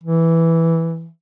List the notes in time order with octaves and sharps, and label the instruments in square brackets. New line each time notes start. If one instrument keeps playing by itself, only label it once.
[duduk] E3